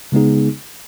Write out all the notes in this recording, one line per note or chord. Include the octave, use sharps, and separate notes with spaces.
C#3 G#3 B3 D#4 G#4